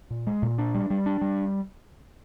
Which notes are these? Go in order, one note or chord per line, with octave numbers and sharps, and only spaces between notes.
A#2
G#3
A#2
D4
G3
G3
D4
G3